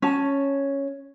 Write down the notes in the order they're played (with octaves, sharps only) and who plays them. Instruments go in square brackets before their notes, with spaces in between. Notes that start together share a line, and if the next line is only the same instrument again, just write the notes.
[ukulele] C#4 A5